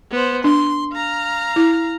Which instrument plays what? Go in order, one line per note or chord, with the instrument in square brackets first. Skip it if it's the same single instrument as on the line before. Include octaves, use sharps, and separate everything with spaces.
[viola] B3 C5
[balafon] D4 [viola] C6
[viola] F5 A#5
[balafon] E4